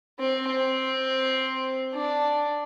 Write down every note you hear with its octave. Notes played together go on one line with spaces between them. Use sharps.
C4
C4
D4